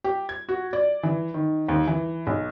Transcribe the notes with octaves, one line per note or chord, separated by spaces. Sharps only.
G4
G#6
F#4
D5
E3
D#3
D#2
E3
B1